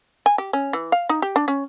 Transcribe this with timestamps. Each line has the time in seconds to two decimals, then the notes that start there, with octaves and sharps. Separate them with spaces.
0.26 G#5
0.38 G4
0.53 C#4
0.73 E3
0.92 F5
1.09 D#4
1.22 G4
1.36 D4
1.48 C#4